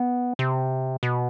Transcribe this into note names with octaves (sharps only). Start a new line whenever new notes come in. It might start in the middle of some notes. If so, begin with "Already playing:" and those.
Already playing: B3
C3
B2